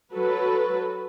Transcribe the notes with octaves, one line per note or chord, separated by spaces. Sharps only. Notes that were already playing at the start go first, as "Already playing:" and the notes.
F#3 F#4 A4 B4